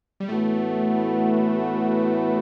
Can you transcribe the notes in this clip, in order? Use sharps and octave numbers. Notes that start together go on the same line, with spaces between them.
G3
A2 E3 A3 B3 F#4 B4